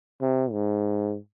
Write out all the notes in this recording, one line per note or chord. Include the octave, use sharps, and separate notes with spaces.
C3
G#2